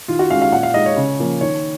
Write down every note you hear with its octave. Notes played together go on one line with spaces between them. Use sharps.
D#3 F4
F#4
G#3 C#4 F5
F5
A#2 F#5
F5
G#3 D#4 D#5
C#5
C#3
F3 A#3 C#4
D#3 C#5